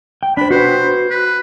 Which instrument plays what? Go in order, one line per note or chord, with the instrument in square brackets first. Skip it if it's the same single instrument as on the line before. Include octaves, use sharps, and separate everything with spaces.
[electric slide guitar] G5
[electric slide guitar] D4 C5 [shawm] B5
[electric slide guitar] F#4 B4 [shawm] C5
[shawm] B4